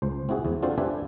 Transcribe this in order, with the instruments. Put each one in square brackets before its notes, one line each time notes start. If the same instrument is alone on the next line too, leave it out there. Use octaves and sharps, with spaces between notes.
[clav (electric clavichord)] C#2 C5
C4 E4 F#4 G#4
E2
C4 D4 F4 F#4 A4 C5
D4 G4 B4 E5 G#5